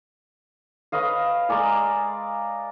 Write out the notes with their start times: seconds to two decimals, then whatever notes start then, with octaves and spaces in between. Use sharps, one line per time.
0.92 B4 C#5 D#5 F5
1.49 G#3 A#4 D5 G#5